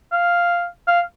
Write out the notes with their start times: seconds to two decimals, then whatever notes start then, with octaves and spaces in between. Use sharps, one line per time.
0.12 F5
0.87 F5